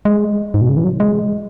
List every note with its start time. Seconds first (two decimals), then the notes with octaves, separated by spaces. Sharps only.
0.05 G#3
0.54 G#2
0.61 B2
0.69 C#3
0.77 E3
0.84 F#3
1.00 G#3